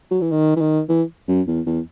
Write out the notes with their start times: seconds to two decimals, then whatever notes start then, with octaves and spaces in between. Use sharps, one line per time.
0.11 F#3
0.21 E3
0.31 D#3
0.56 E3
0.61 D#3
0.89 E3
1.28 F#2
1.47 E2
1.66 E2